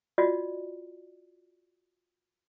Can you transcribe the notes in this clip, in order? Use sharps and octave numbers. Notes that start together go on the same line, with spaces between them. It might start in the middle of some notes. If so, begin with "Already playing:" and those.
F4 F#4 D5 D#5